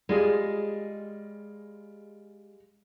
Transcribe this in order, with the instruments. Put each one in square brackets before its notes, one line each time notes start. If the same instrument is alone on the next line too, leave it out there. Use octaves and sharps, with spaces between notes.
[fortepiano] G3 F4 G#4 [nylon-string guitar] G#3